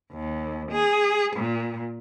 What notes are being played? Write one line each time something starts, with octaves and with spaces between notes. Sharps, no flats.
D#2
G#4
A#2